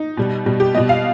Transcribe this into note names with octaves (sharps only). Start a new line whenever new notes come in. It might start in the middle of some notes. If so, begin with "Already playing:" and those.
Already playing: D#4
B2 G3
B2 G3
G4
B2 G3 D#5
F5